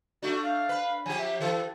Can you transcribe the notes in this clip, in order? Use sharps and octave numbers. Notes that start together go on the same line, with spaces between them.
A3 D4 F#4
F5
B4
F3 G4 G#5
E5
E3 A4